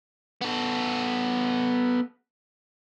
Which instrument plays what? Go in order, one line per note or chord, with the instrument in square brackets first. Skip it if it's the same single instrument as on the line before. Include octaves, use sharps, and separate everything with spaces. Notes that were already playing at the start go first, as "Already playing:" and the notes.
[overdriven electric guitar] B3 A4